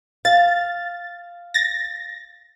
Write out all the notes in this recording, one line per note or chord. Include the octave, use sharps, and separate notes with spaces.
F5 A6
A6 A#6